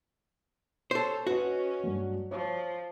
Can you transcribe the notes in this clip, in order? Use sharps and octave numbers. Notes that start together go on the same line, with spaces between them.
A4 C5 C#5
C#4 F#4 B4 D#5
G2 F#3
F3 C#5